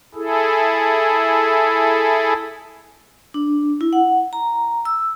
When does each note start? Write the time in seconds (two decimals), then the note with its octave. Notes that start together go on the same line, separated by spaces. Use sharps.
0.15 E4 G#4 A4
3.34 D4
3.81 E4
3.93 F#5
4.33 A#5
4.85 E6